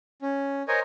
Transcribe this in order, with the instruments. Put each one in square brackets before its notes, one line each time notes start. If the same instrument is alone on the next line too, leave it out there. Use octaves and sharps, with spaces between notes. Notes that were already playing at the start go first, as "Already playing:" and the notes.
[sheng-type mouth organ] C#4
A#4 C5 C#5 D#5 G#5